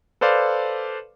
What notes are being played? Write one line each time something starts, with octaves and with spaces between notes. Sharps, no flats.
A4 B4 C5 D5 F5